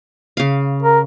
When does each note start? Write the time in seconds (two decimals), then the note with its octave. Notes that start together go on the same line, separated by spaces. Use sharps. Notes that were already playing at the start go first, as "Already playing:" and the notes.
0.37 C#3 F5
0.83 A#4